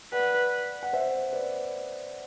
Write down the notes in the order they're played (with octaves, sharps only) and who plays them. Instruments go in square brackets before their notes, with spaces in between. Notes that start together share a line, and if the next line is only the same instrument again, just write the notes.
[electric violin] B4 [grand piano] D5 F#5
[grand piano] F#5
C5 E5
B4 D5